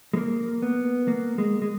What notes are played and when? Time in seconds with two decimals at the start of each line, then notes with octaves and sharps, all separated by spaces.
0.14 G#3
0.17 A#3
0.62 B3
1.08 A#3
1.38 G#3
1.62 G#3